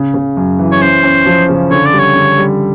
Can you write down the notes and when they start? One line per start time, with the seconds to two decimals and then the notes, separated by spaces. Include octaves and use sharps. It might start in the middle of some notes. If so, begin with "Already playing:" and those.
Already playing: C#3
0.14 C#3
0.37 F#2
0.59 E3
0.72 C#5
0.81 C#4 C5
1.04 C#4
1.26 F3
1.49 C#3
1.70 D3 C#5
1.85 D5
1.93 G3
1.99 C#5
2.16 D3
2.38 G3